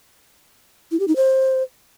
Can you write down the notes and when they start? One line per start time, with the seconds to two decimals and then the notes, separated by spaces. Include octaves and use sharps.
0.91 E4
1.00 G4
1.08 D#4
1.16 C5